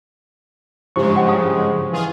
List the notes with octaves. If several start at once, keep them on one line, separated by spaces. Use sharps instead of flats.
G2 C#3 F3 G#3 E4 G4 C5 C#6
F#5 G5
F5 A5 D#6
E3 F4 G#4